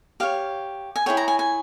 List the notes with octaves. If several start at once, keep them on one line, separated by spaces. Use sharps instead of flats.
G4 C#5 F5
G#5
E4 G#4 C#5 G5
A#5
G#5
G#5